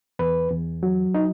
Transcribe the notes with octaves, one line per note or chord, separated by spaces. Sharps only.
E2 B4
E2
F#3
D#4